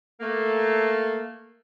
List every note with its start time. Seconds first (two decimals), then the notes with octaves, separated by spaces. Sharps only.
0.21 A3 A#3